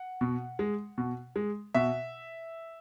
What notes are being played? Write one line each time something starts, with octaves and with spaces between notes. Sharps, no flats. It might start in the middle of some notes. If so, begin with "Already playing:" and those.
Already playing: F#5
B2
G#3
B2
G#3
B2 E5